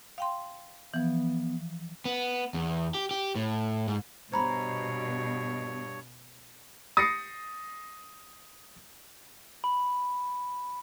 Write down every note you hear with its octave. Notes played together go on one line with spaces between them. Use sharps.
F5 G5 C6
E3 F3 B3
B3
E2
G4
G4
A2
G#2
G2 B2 C5 C#5 A#5 B5
D#6 A6 A#6 C7 C#7
B5